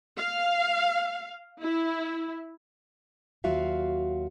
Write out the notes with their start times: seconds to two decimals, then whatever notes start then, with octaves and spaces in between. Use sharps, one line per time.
0.18 F5
1.62 E4
3.44 D#2 F#3 F4 F#4 E5 F5